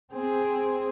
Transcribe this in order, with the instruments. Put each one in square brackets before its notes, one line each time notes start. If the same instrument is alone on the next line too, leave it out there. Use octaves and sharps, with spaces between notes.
[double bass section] C4 [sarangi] G#4